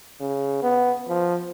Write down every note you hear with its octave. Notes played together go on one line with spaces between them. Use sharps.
C#3
B3
F3